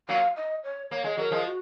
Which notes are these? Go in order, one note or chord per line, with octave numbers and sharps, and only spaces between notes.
F#3 A#3 F5
D#5
C#5
A#3 C#5
G#3
F#3 A#4
F3 G#3
F#4